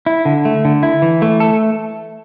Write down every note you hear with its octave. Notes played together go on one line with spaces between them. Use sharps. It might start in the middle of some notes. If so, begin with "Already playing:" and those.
E4
D3
A3
D3
E4
E3
A3
A4